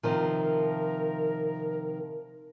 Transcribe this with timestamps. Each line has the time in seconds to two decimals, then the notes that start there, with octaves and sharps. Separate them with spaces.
0.03 C3 D#3 F3 A#4